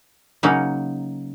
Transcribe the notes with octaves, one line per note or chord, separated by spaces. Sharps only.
C#3 F#3 A#3 D#4